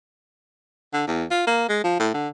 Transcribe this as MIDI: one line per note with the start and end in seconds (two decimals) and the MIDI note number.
0.93 1.05 50
1.07 1.24 40
1.31 1.44 65
1.47 1.68 58
1.69 1.80 56
1.84 1.98 53
2.00 2.09 45
2.14 2.28 50